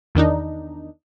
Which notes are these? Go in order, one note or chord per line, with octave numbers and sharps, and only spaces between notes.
E2 D#3 D4 D#4